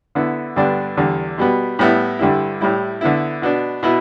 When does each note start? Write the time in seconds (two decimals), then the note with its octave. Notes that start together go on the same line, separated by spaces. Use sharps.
0.15 D3 B3 E4
0.56 G2 D3 G3 B3 D4
0.97 E2 D3 G3
1.38 B2 G3 B3
1.79 A2 G3 B3 E4
2.19 G2 D3 G3 E4
2.61 A2 G3 E4
3.01 D3 B3 E4
3.42 B2 B3 D4
3.83 B2 B3 E4